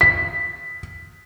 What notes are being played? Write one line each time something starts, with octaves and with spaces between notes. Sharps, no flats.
B6